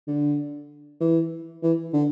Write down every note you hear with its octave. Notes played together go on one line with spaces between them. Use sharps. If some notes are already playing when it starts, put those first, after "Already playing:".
D3
E3
E3
D3